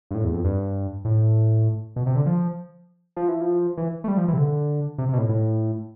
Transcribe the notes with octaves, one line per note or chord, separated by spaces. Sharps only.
G2
A2
E2
F2
G2
A2
B2
C3
D3
F3
F3
E3
F3
E3
A3
G3
F3
E3
C3
D3
C3
C3
B2
A2
A2